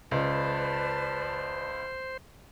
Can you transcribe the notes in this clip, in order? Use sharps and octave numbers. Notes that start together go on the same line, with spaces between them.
C#2 B4 C5 D5 A5